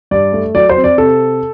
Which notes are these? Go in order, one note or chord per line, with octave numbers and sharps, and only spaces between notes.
G2 D5
A3
F#3 D5
C5
C4
D5
C3 A4